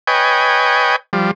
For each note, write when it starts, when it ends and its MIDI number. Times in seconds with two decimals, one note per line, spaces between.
0.07 0.96 71
0.07 0.96 73
0.07 0.96 75
0.07 0.96 79
0.07 0.96 80
1.13 1.31 53
1.13 1.31 55